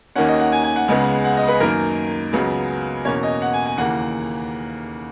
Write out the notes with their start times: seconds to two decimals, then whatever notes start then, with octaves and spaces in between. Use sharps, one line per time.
0.16 D#2 D#3 A#3 C#4 F#5
0.28 D#5
0.40 F#5
0.52 G#5
0.64 G#5
0.76 F#5
0.88 C#2 C#3 G#3 B3
1.24 F#5
1.37 D#5
1.48 B4
1.60 F#2 D#3 A#3 A#4
2.33 C#2 C#3 F#3 B3
3.05 E2 B2 A#3 C#4 C#5
3.23 D#5
3.42 F#5
3.54 G#5
3.66 G#5
3.78 D#2 C#3 E3 A#3 F#5